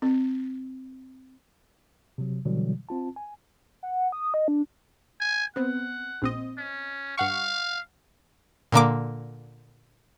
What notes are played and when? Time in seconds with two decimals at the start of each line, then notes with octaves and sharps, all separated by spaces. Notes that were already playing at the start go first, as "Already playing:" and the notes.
0.02 C4
2.18 C3 F#3
2.45 B2 D3 E3 F#3 G3
2.89 C4 F4 A5
3.16 G#5
3.83 F#5
4.12 D#6
4.34 D#5
4.48 D4
5.21 G#5
5.56 B3 C4 F#5
6.22 A#1 C4 D#5
6.58 C#4
7.18 G2 F5 F#5 C#6
8.72 A#2 D3 A#3 D6